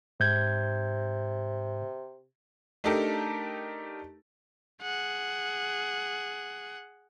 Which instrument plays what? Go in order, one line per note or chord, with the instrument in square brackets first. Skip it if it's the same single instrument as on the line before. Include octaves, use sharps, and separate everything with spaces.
[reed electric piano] G#2 G6 G#6 [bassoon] C3
[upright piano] A3 D4 D#4 G4 A4 A#4
[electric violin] G#4 F#5